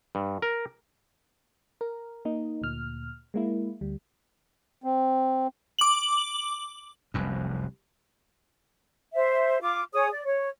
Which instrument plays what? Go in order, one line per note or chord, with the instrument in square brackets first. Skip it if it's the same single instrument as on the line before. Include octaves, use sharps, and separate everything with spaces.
[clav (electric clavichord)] G2
A#4
[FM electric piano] A#4
A#3 D#4
D2 A#2 F6
G#3 A#3 E4
D2 G3
[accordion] C4
[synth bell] D6 F#7
[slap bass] F1 C2 F#2
[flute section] C5 E5
F4 D6
G#4 C#5 D#6
D5
C#5